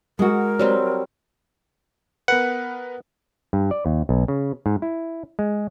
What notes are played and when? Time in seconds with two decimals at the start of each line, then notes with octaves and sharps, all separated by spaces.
0.19 G#3 F#4 A#4
0.59 F#3 G3 C4
2.28 B3 A#4 B4 F#5
3.53 G2
3.71 D5
3.86 D#2
4.09 B1
4.28 C#3
4.66 G#2
4.82 E4
5.39 G#3